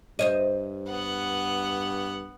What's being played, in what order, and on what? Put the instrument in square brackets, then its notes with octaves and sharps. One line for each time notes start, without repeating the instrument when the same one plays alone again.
[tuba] G2 [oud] C5 C#5 D#5
[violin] B3 F#5